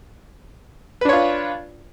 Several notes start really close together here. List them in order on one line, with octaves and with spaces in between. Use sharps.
B4 D4 C#5 F4